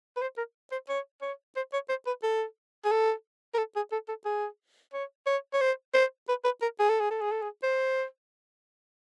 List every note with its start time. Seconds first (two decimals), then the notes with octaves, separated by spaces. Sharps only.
0.17 B4
0.22 C5
0.37 A#4
0.72 C5
0.89 C#5
1.22 C#5
1.56 C5
1.73 C#5
1.89 C5
2.07 B4
2.23 A4
2.85 G#4
2.91 A4
3.54 A#4
3.58 A4
3.76 G#4
3.92 A4
4.08 A4
4.25 G#4
4.93 C#5
5.26 C#5
5.53 C#5
5.61 C5
5.94 C5
6.29 B4
6.45 B4
6.62 A#4
6.79 G#4
6.89 A4
7.00 G#4
7.11 A4
7.21 G#4
7.32 A4
7.42 G#4
7.63 C5